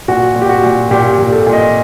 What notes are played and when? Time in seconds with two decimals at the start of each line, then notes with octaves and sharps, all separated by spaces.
0.08 A#2 F#4
0.36 A#2
0.42 G4
0.49 F#4
0.63 A#2
0.91 A#2 G4
1.11 G4
1.19 A#2
1.32 A4
1.46 A#2
1.53 D#5